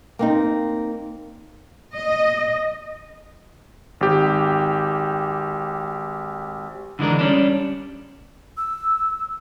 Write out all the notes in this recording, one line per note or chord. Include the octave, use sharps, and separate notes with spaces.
A#3 C4 D#4
D#5
G#1 G4
D3 E3 G#3 D4 A#4
G3 C#4 D4
E6